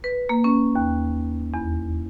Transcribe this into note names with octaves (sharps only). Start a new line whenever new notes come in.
B4
A#3
C#4
D#2
E2